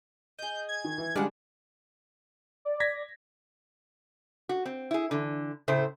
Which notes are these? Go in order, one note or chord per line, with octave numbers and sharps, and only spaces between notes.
G#4 D#5 G6
G#6
D#3
E3
D3 G3 G#3 C#4 D4 F5 F#5
D5
G#6 A#6 B6
F#4
C4
E4 G#4
D3 E3
A2 C#3 A3 C5